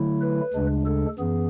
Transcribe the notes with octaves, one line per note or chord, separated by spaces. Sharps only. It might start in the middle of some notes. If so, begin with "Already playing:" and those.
Already playing: D3 F#3 A3 E4
B4
D2 C#3 G#3 D4
A4
F#2 E3 B3 G#4